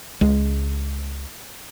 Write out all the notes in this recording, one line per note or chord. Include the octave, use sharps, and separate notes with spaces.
C#2 G#3